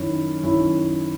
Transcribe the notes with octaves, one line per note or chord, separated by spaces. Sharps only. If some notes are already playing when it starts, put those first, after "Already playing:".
Already playing: F#2 D#3 C#4 E4
F#2 D#3 C#4 E4